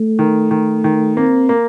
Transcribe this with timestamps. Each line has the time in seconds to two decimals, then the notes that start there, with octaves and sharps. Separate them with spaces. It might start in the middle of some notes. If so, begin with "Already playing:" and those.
Already playing: A3
0.19 D#3
0.51 D#3
0.84 D#3
1.17 A#3 C4
1.49 A#3